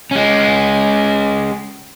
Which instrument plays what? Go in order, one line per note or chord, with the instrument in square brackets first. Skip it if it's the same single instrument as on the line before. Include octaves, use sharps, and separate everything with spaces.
[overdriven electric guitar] G#3 C#4